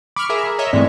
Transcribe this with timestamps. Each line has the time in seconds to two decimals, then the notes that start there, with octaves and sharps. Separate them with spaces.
0.16 B5 C#6 D6 F6
0.30 G#4 A#4 E5
0.46 A#5
0.59 C#5 D#5 E5
0.73 G#2 E3 G#3 A3 C4 D5